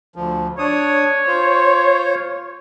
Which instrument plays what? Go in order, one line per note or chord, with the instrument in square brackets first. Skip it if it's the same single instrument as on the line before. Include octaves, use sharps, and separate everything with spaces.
[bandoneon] D2 F3
[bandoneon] D4 D#6 [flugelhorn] C#5
[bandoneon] F4 C5